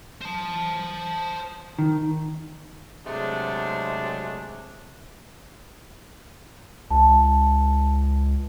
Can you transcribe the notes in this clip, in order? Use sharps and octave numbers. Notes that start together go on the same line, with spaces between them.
C5 A5
D#3
C3 F#3 G#3 A3 D4
C#2 A5